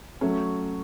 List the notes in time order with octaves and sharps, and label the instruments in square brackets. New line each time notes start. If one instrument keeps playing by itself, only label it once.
[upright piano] F#3 A3 C#4